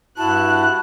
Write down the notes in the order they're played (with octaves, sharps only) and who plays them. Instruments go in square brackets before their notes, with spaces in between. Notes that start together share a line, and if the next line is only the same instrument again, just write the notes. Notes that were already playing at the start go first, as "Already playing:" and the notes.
[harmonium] G2 E4 F#4 [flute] A5 [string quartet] F#6